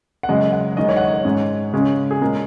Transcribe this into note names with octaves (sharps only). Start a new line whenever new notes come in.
F#5
F#2 C#3 G#3 D#5
F#5
F#2 D#3 G#3 D#5
C#5
F#5
D#5
C#5
G#2 G#3 C#4
C#3 G#3 C#4
G#4
A#2 G#3 C#4 A#4